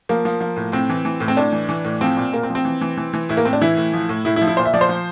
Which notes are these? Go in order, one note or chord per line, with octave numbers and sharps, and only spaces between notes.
F3 A#3
F3
F3
A2
A2 C4
E3
E3
A2
C4
A2 D4
E3
E3
A2
F3 C4
A#2
A#2 A#3
C4
F3
C4
E3
E3
E3
E3
A2 E4
A#3
A2 C4
D4
E3 E4
A2
F3
A2
A2 E4
E4
F3
E4
A#2 C5
E5
F3 D5
C5
F3